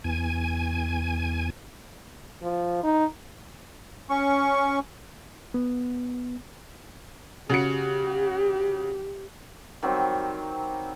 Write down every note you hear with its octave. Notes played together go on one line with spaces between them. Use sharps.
E2 G#5
F3
D#4
C#4 C#6
B3
C#3 F#4 G4 C#7
D#3 F#3 G3 C4